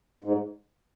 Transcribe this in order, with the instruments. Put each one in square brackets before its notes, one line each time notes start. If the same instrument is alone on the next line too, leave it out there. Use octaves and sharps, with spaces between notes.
[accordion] G#2